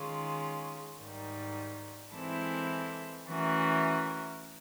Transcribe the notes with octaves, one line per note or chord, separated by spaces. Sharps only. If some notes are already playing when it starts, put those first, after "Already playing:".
Already playing: D#3 G#3 C#4 F4
G#2 D#3 G3
E3 G#3 C4 E4 A4
E3 A3 C#4 F#4 A#4